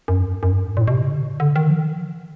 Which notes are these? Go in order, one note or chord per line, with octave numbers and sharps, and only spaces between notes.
F#2
F2
F#2
F#2
G2
G#2
A#2
A2
B2
C3
C#3
D3
D3
D#3
F3